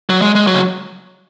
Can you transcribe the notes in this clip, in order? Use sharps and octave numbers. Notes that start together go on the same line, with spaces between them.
F#3
G#3
G#3
F#3
C#3